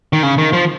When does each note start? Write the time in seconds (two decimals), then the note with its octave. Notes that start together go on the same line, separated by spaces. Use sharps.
0.13 D#3
0.23 C#3
0.38 D#3
0.53 F3